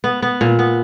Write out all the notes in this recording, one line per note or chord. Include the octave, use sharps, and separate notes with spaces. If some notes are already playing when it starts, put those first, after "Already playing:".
B3
B3
A#2
B3